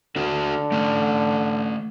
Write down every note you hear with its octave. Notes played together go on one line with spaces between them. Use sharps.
D3 D4 F#4 D5
A3 C#4